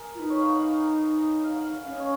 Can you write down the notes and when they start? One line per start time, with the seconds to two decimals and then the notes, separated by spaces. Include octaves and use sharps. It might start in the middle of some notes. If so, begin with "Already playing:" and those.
Already playing: G#4 A#4
0.15 F4
0.19 D#4 B4
0.30 C#5
0.40 F5
0.50 F#5
0.61 F5
1.44 F5
1.54 F#5
1.64 F5
1.75 F5
1.85 C#4 F5
1.92 D#5
2.00 C#5